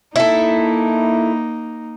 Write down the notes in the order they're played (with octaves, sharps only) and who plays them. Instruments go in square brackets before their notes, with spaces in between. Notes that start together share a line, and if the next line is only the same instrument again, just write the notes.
[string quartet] A#3 D#4 [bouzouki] E4 A4